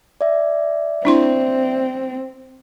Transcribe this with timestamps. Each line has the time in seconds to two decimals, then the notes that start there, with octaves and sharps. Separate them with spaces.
0.21 D5 E5
1.05 C4 D4 E4 C6